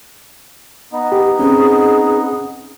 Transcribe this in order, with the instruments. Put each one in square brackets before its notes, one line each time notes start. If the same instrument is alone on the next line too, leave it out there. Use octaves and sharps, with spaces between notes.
[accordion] B3 D#4
[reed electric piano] G4
[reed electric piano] C4 C#4 [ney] G#4